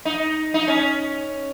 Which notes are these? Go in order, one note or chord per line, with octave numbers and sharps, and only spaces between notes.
D#4
D#4
C#4